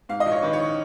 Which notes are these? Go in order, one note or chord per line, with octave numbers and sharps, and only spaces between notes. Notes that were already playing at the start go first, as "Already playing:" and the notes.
G#2 F5
D#5
A#1
C#5
D#3 B4
C#5